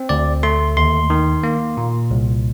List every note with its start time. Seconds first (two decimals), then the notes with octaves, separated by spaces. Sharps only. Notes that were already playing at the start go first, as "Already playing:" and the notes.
Already playing: C4
0.09 D2 D5
0.43 A3 C6
0.77 D#2 C6
1.10 D#3
1.43 A#3
1.77 A#2
2.11 C2